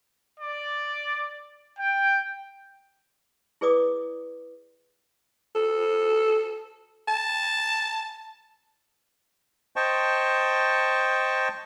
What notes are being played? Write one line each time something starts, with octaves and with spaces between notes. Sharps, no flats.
D5
G5
E4 G#4 B4 D5 D6 D#6
A4
A5
C5 D#5 G5 A5 C#6